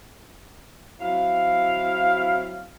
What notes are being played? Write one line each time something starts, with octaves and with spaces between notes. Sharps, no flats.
F#3 C4 E4 F5